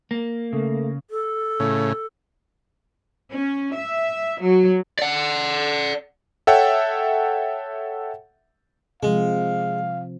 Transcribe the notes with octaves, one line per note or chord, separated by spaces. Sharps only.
A#3
C#3 A3
A4
A2 C#3
C#4
E5
F#3
D5 F#5
A4 C#5 E5 F#5 G5
C3 F3 G#3 F5